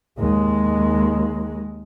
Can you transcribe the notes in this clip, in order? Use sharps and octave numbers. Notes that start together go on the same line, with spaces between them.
D#2 G#3